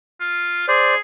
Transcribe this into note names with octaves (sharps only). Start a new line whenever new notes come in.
F4
G#4 C5 D5